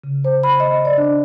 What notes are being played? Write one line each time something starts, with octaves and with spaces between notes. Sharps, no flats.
C#3
C5
B5
D#5
D5
D4